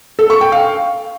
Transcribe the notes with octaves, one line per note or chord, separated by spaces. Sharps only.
A4
C#6
G5
F5